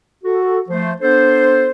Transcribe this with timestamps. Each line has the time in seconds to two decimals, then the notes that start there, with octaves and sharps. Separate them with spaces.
0.24 F#4 A4
0.69 F3 A3 C5
1.01 B3 D4 A4 C5